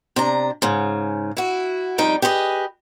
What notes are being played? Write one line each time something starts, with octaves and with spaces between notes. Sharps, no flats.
C3 D4 A#5
G#2 C#3
E4 F#4
F2 G3 D#4 G5
G4 G#4 B4 C5 D#5